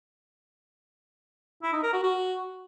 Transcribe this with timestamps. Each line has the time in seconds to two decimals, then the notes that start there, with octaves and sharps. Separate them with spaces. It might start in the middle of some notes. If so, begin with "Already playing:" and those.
1.63 E4
1.73 D#4
1.83 A#4
1.93 F#4
2.03 F#4